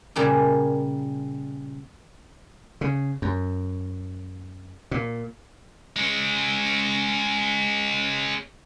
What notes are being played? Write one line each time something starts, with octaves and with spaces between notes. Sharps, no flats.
A#2 C#3 G3 C#4 A#4
C#3
F#2
A#2
G#3 C#4